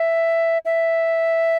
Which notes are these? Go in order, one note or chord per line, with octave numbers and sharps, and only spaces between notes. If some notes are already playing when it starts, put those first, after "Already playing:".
Already playing: E5
E5